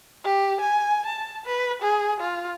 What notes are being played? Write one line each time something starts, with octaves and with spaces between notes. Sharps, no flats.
G4
G#5
A5
B4
G#4
F4